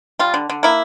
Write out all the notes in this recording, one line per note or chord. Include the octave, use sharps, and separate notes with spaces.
G3 F4
D3
D3
A#3 E4